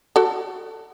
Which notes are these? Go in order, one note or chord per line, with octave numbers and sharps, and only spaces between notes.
F#4 A4